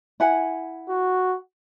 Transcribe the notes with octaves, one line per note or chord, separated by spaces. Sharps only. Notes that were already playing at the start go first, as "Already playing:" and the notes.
E4 F#5 G#5
F#4